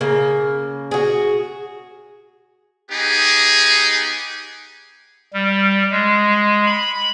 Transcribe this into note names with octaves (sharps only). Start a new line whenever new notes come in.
C#3 A#3
F#4 G#4
B3 D#4 G4 G#4
G3
G#3
B5